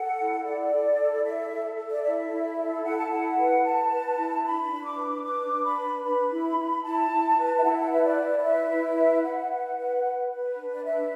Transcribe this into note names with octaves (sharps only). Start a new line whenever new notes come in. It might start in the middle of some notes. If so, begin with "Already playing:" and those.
Already playing: A4 F#5
E4
A4 D5
A4
E4
A4 E5
A4
A4
D5
E4 E5
E4
A4
E4 F#5
A5
E4 F#5
B4
B4 A5
B4
E4
D4 B5
D4
D6
B4
D4 D6
D4
B5
B4
B4 B5
E4
E4
E4 A5
E4
B4
E5
E4 F#5
F#5
B4 E5
D5
E4
D5
B4 E5
E4
B4
B4 F#5
B4
B4
B4
B4
D4
D5
B4 E5